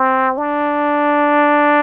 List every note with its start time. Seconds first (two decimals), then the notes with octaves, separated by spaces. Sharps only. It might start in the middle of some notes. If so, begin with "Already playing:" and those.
Already playing: C4
0.37 D4